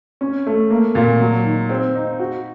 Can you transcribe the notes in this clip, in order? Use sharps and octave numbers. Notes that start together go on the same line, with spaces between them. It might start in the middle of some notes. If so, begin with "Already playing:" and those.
C#4
A3
A#3
A#2
F#3
D#3
C4
D#4
F#4